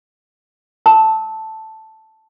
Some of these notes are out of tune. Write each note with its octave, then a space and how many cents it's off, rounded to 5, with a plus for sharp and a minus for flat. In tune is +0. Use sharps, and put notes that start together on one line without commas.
A5 +0 E6 -35